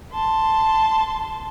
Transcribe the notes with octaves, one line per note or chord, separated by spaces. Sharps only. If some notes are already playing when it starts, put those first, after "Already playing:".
A5 C6